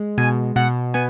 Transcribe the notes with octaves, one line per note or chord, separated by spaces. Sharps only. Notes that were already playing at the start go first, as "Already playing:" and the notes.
Already playing: G#3
B2 G#5
B2 F#5
B3 G#5